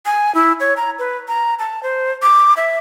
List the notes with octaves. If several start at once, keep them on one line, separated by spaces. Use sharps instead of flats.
G#5
E4
C#5
A#5
B4
A#5
A5
C5
D6
E5